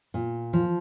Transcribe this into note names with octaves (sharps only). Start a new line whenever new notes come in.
A#2
F3